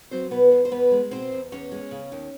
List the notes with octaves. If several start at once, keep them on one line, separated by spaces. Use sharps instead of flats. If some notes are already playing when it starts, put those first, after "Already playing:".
F#3 C4 C5
B2 B3 B4
E2
C5
E2 B3 B4
G#3
B2 C4 C5
E2
E2 C#4 C#5
G#3
C#3
D#2